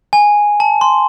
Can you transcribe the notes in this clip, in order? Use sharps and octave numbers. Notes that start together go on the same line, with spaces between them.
G#5
A5
C6